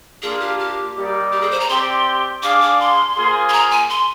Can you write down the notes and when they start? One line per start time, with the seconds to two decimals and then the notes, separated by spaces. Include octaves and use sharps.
0.22 A#3 D4 F4 G#4
0.40 G4
0.59 G4
0.96 G3 A#3 D#4 A#4 D5
1.32 G4
1.41 G#4
1.51 C5
1.60 A#5
1.69 C4 G4 D5 G5 C6
2.42 D4 G#4 D5 F5 D6
2.61 D6
2.80 C6
3.16 A#3 F4 G#4 C5
3.49 C6
3.53 A#5
3.71 G#5
3.90 C6